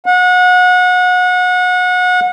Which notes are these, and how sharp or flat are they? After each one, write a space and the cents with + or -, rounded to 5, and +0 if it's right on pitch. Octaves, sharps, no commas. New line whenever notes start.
F#5 -30